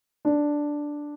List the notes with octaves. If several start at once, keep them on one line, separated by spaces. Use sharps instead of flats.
D4